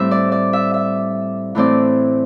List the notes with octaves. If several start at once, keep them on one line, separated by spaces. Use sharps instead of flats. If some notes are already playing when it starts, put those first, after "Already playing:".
Already playing: A2 G3 C4 E5
D5
D5
E5
E5
A2 E3 A3 C4 D5